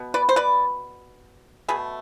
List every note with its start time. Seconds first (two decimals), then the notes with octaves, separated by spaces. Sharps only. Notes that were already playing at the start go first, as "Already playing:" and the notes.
Already playing: B2 B3
0.14 B4 D5
0.29 C5
0.36 B4 D5
1.68 B2 A3 G#4 B4